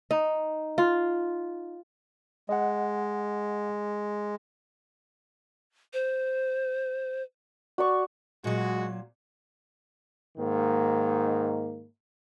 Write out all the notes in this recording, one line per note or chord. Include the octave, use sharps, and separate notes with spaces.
D#4
F4
G#3 D#5 F#5
C5
F#4 D5 C#6
A#2 F#3 G#3 F#4
G#2 D#3 A#3